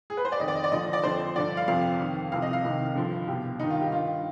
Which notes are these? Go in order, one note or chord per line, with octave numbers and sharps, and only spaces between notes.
G#4
B4
C5
D5
F2 D#3 D#5
D5
D#5
D5
D#2 D3 F3 D#5
D5
F2 D3 F3 C5
G2 D3 F3 D5
F5
F2 C3 F3 F5
F2 D#3
C2 C3 F3 F5
D#5
F5
C2 C3 D#3
G2 D3 F3
C2 B2 G4
G2 D#3 D#4
F4
G4
G2 D#3 F4